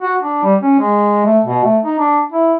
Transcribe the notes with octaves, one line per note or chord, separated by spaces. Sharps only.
F#4
D4
G3
C#4
G#3
A3
B2
A3
D#4
D4
E4